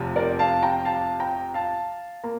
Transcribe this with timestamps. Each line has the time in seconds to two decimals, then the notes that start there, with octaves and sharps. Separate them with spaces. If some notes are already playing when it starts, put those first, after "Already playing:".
Already playing: F1 E2 C3 F3
0.16 A#4 D5
0.39 F5 A5
0.63 G5 A#5
0.85 F5 A5
1.20 G5 A#5
1.54 F5 A5
2.24 A#3 A#5